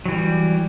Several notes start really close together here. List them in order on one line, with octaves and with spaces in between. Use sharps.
F#3 E3 G3